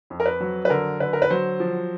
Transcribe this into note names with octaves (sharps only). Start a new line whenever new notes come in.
F2
A#4
B4
F#3
B4
D3 A#4
D3 B4
A#4
B4
F#3 C5
F3